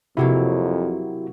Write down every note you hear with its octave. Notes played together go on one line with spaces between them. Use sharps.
F2 C3 F#3 A#3 E4 F#4 G4